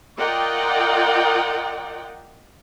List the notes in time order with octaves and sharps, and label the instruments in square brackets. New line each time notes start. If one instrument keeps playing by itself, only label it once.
[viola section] F4 A#4 D5 D#5 F#5 G5